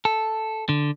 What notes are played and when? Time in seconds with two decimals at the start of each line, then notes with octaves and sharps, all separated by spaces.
0.05 A4
0.69 D3